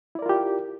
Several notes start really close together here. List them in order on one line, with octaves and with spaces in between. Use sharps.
E4 D5 A#4 F4 G4